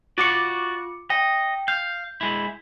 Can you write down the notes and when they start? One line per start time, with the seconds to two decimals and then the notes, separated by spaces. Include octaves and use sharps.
0.18 F4 F#4 D5 D6 C#7
1.10 D#5 G5
1.68 F5 G6
2.21 G#3 E4